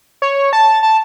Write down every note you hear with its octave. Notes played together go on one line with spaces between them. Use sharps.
C#5
A5
A5